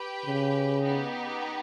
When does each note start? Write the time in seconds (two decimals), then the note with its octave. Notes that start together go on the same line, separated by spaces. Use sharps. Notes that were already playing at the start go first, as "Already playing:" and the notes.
Already playing: G4 B4 G5
0.26 C#3
0.81 B3 D#4 G4